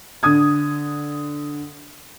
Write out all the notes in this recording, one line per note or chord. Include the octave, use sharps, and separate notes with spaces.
D3 D#6 G#6